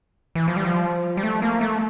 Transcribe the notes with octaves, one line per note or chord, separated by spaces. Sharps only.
E3
F3
G3
F3
G3
A3
A#3
A3